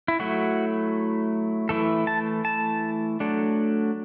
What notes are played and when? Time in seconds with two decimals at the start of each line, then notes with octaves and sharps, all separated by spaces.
0.08 E4
0.19 F#3 A3 E4 F#4
1.69 E3 A3 E4 A4
2.07 A5
2.45 A5
3.20 F#3 A3 D4